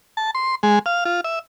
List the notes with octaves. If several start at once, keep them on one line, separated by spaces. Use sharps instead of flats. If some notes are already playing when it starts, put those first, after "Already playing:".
A5
C6
G#3
F5
F4
E5